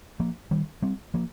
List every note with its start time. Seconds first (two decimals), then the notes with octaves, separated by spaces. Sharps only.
0.20 F3 A#3
0.51 D#3 G3
0.82 G3 C4
1.14 F3 A#3